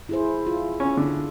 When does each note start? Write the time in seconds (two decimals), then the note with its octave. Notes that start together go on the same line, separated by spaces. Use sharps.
0.09 E4 G#4 C5
0.47 F4
0.80 C#4
0.97 D3